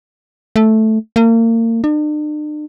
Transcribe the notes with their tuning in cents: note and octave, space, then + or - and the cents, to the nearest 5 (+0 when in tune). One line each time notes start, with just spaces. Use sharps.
A3 -5
A#3 -35
D4 +45